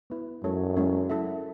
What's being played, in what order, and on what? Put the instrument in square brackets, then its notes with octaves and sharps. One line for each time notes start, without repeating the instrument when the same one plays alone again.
[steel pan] B3 E4 B4
[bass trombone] F#2 [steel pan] G#3 C#4 E4 A4 C#5
[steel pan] G#3 C#4 E4 A4 C#5
E4 A4 E5